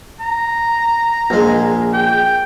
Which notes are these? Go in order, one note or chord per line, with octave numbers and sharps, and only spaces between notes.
A#5
A#1 G#3
G5